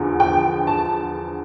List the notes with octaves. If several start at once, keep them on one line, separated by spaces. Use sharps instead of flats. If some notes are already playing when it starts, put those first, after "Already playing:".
Already playing: E2 D3 F3
G5
A5